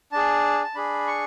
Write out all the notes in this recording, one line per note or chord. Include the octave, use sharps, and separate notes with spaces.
D4 G#4 A5
A5
D4 G#4 B5
C#6